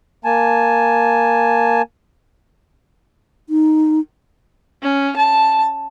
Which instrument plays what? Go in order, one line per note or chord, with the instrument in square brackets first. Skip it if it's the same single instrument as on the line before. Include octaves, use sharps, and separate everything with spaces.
[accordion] A#3 G#5 A5
[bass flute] D#4
[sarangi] C#4
A5